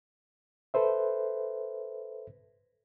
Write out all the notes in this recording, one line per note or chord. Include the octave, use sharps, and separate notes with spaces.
A4 B4 C5 E5